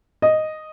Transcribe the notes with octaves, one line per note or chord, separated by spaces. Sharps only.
D#5